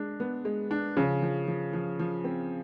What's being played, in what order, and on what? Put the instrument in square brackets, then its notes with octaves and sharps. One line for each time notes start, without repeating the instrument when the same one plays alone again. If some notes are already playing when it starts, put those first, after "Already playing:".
Already playing: [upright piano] G#3 D4
B3
G#3
D4
[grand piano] C#3 [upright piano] F3
[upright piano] F3
F3
F3
F3
C4